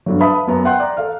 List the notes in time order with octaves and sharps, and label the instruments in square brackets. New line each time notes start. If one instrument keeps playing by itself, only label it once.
[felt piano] G2 D3 F#3
B4 E5 F5 A5 B5 D#6
F#2 B3 A#5
E5 F#5 G5 C6 F#6
D5 A#5
A4 F5 F6